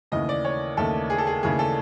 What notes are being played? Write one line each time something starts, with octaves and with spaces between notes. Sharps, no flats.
D#2 C#3 E3 A3 D#5
D5
C#5
D#2 C#3 E3 A3 A4
G#4
A4
G#4
D#2 C#3 E3 A3 G#4
A4